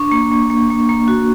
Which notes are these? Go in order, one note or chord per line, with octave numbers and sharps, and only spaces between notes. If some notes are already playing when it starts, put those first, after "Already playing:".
Already playing: D4 C#6
A#3
A#3
A#3
A#3
A#3
F#4